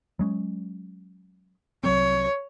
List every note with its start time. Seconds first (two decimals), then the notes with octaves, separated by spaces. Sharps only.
0.19 F#3 G#3 C#4
1.84 C2 F#3 C4 C#5